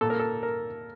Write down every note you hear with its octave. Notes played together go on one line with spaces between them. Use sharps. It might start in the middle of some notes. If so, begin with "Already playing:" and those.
A#2 A4
A#4
A4
A#4